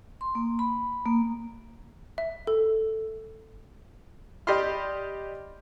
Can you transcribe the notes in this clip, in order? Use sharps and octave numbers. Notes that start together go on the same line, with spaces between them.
C6
A#3
B5
A#3
E5
A4
G4 D5 D#5 B5 C6 F6